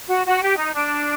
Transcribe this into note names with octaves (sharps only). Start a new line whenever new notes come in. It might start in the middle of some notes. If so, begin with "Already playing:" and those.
F#4
F#4
G4
D#4
D4